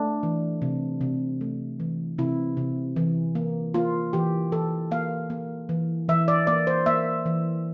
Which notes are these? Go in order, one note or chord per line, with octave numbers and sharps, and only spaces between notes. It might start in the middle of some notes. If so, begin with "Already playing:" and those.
Already playing: A3 D4
E3
C3
C3
A3
E3
C3 E4
C3
E3
A#3
A#3 F4
E3 G4
E3 A4
A#3 F5
A#3
E3
E3 E5
D5
A#3 D5
C5
A#3 E5
E3